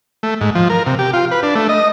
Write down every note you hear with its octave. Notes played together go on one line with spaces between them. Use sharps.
A3
G#2
F3
A#4
C3
G4
F4
B4
D4
A3
D#5